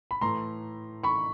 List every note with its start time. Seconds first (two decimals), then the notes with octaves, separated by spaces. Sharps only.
0.11 B5
0.21 A2 E3 A3 A#5 C6
1.04 B5 C#6